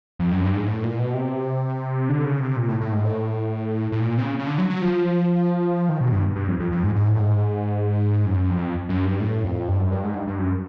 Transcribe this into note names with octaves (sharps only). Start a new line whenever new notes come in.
F2
F#2
G2
G#2
A2
A#2
B2
C3
D3
C#3
C3
A#2
A2
A2
G#2
A2
A2
A#2
C3
C#3
C#3
D3
F#3
F#3
F3
D#3
B2
G2
G2
F2
F2
F2
G#2
G#2
A2
G#2
F#2
F2
F#2
G2
A2
F2
G2
F#2
G2
G#2
G2
G2
F#2